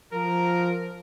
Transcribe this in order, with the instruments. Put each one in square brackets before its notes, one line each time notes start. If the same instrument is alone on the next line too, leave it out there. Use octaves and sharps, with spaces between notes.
[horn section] F3 A#4